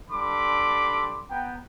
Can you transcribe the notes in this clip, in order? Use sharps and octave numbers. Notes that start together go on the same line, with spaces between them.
G3 D4 A4 B5 C6 D6
B3 G5 A#5